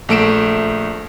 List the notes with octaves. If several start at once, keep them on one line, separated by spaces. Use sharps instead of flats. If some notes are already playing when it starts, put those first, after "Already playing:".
A#1 A3 D7 E7